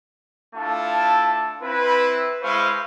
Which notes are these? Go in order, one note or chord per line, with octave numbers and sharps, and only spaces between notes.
A3 D4 E4 F4 A5
C4 E4 B4
G#3 E4 B4 C5 F5 C#6